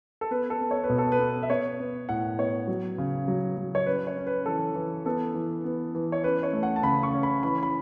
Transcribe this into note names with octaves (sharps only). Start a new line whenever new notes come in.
A4
B3 B4
A4
B3
C#5
B4
B2
A4
B4
B3
E5
B3 C#5
B3
A2 F#5
B3 C#5
F#3
C#3
F#3
F#3
C#5
C#4 B4
C#5
C#4
B4
E3 A4
E3
B3 A4
E3
B3
E3
C#5
C#4 B4
C#5
A3
F#5
A5
C#3 B5
C#6
C#4
B5
E3 B5
B5